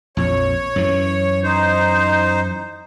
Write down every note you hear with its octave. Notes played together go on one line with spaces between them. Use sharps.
A#1 F2 C#5
F#2 E3
D#4 C5